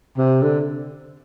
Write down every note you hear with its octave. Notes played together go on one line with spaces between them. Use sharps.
C3
D3